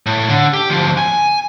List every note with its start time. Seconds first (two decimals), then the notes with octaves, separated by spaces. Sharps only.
0.06 A2
0.29 D3
0.53 G4
0.70 D2 F3
0.97 G#5